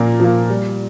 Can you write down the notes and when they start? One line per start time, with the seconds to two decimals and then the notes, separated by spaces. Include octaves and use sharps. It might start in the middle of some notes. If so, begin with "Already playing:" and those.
Already playing: A#2 F3 A#3
0.20 F3 A#3
0.50 G3